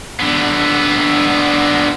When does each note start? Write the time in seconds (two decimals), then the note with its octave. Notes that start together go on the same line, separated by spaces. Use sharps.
0.19 D3 B3